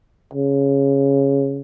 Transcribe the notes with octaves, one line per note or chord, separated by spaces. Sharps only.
C#3